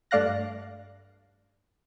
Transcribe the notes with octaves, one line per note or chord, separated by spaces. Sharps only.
G2 A3 D5 F5 F#6 A#6